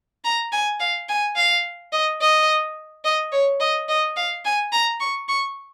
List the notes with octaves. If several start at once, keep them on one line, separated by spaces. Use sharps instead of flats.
A#5
G#5
F5
G#5
F5
D#5
D#5
D#5
C#5
D#5
D#5
F5
G#5
A#5
C#6
C#6